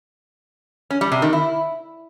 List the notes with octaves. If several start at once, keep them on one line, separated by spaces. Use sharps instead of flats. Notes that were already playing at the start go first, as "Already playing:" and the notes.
C#4
G3
C3
D#3
E4